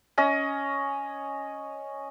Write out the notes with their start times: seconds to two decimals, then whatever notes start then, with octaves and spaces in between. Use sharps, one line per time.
0.18 C#4 D#5